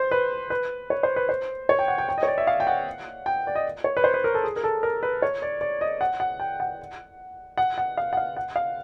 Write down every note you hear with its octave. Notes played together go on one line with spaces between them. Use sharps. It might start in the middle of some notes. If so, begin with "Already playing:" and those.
Already playing: C5
B4
B4
C#5
C5
B4
C5
C#5
G5
F#5
G5
G5
D#5
C#5
D5
E5
F5
G5
F#5
G5
D5
D#5
C#5
B4
C5
B4
A#4
A4
G#4
A#4
A4
A#4
B4
C#5
D5
D5
D#5
F#5
F#5
G5
F#5
F#5
F#5
F5
F#5
F5
F#5
F5